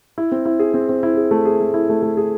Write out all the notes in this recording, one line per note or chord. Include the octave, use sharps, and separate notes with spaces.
E4
C4
E4
G#4
C4
C4
E4
G#4
A3
G#4
A3
E4
A3
A3
G#4